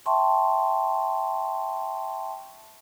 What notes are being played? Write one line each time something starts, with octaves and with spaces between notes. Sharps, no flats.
E5 G5 A5 C6 C#6